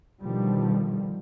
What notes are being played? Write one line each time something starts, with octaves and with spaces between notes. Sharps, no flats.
B2 D3 D#3 F3 G3